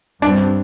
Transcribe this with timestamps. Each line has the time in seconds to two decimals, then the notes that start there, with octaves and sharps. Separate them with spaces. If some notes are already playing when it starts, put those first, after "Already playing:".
0.22 G2 G3 C4 D4